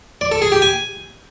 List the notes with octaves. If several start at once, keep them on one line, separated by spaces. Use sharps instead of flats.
D5
A4
G#4
G4
G#5